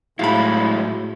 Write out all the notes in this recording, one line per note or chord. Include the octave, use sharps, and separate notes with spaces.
A2 F#3 G#3 E4 F5 B5